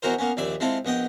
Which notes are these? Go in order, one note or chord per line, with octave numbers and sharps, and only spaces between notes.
B2 E3 F#4 A#4 C5
A#3 B3 C#4
A#1 D#2 D5 E5 B5
G#3 C4 E4 F4 A4
A#1 B3 D#5 G5